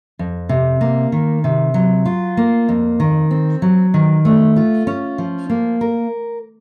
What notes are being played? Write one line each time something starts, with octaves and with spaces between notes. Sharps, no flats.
F2
C3
A#3
D#3
C3
F#3
F4
A#3
F2
D#3
C4
F#3
D#3
A3
F4
C#4
F3
A#3
A#4